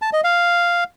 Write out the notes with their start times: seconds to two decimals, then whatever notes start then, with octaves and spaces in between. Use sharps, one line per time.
0.02 A5
0.13 D#5
0.24 F5